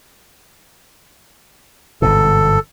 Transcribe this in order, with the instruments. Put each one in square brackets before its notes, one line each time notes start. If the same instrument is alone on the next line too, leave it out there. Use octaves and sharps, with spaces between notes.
[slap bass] G1 G#2 B2 [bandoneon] A4